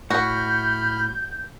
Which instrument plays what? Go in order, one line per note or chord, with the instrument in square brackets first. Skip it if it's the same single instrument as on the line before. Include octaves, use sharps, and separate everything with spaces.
[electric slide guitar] A2 [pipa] F#4 [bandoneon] B5 F6 [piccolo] G6